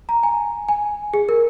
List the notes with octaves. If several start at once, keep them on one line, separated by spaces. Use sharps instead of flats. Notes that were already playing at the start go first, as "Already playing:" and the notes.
A#5
G#5
G#5
G#4
A#4